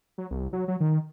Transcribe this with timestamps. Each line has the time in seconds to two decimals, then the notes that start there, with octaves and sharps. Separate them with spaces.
0.18 F#3
0.31 C2
0.53 F#3
0.68 F#3
0.80 D#3